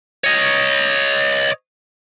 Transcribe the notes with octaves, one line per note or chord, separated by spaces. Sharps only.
C#5 D#5